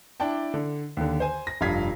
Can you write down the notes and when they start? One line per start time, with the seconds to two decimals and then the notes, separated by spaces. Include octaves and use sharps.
0.20 D4 E4 D5 G5 A5
0.54 D3
0.97 D#2 D3
1.20 C5 G#5
1.47 A#6
1.61 F1 G2 F4 F5 G#6 B6